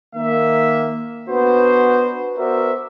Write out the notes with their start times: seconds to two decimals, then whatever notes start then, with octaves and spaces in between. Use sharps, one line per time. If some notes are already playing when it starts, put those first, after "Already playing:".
0.15 D#3 A#3 E5
1.29 B3 D4 F#4 B4 C5
2.37 B3 F#4 A#4 C5 D5 E5